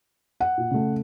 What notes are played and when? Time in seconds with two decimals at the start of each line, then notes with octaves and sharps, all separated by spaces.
0.40 F#5
0.58 A#2
0.71 C#3 A3